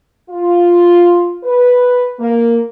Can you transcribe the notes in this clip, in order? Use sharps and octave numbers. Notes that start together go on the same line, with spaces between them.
F4
B4
A#3